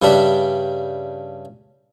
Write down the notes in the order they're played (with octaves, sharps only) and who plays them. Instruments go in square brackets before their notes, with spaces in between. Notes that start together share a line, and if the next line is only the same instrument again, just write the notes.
[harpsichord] G2 C#3 G3 D4 E5